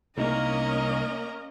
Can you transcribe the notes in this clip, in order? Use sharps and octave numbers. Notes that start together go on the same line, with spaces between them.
C2 A#3 C#4 D#4 A#4 D#5 A#5